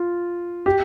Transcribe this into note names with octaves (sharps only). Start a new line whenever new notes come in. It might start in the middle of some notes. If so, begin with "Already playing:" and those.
Already playing: F4
G4